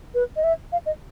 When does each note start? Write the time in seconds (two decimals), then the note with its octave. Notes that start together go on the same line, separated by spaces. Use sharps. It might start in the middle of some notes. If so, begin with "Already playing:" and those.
0.15 B4
0.36 D#5
0.44 E5
0.72 F5
0.86 D#5